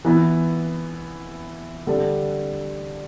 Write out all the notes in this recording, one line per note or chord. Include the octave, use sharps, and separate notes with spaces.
E3 B3 E4
D3 G3 D4 A4